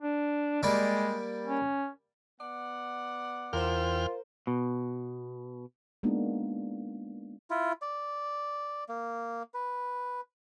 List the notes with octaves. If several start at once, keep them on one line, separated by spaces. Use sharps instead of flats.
D4
G3 G#3 A#3 D5
C#4
B3 D5 F#5
E2 F4 A#4 C5 G5 F6
B2
G#3 A#3 B3 D4 D#4 F4
E4 F4
D5
A#3
B4